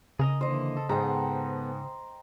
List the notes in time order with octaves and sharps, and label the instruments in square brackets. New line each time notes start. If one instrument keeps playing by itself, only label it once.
[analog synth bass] C#3 [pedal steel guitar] G#4 A#4 D#5
[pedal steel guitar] D3 E3 A#3 [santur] C5 D#5
[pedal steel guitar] A4
[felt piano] G#2 [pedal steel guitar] B3 A4 [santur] C5 G5 A#5